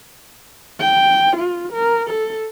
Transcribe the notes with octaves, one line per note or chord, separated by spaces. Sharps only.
G5
F4
A#4
A4